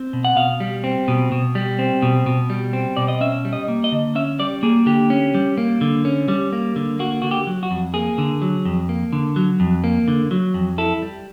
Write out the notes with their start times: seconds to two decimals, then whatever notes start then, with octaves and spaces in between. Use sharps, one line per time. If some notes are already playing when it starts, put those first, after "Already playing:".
Already playing: C4
0.13 B2
0.25 F#5
0.36 B2 F5
0.60 G3
0.84 C4
1.08 B2
1.32 B2
1.55 G3
1.79 C4
2.02 B2
2.26 B2
2.50 G3
2.73 C4
2.97 B2 D5
3.08 D#5
3.21 C#4 E5
3.45 G3
3.53 D#5
3.68 A#3
3.84 D#5
3.92 D3
4.15 C#4 E5
4.39 G3 D5
4.63 A#3 G#4
4.86 D3 G4
5.10 C#4
5.34 G3
5.58 A#3
5.81 D3
6.05 C#4
6.28 G3
6.53 A#3
6.76 D3
6.99 A#3 F#4
7.22 D3 F#4
7.31 G4
7.47 F#3
7.63 F#4
7.71 F2
7.94 A#3 G#4
8.18 D3
8.42 F#3
8.65 F2
8.89 A#3
9.13 D3
9.36 F#3
9.60 F2
9.84 A#3
10.08 D3
10.31 F#3
10.54 F2
10.78 E4 A4
11.02 G3